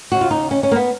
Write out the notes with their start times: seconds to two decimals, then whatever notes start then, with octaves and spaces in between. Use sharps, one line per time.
0.12 D#2 C#3 F#4
0.21 F4
0.31 D#4
0.51 C#4
0.63 C#4
0.71 A#3
0.76 B3